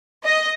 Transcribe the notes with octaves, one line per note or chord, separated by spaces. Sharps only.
D#5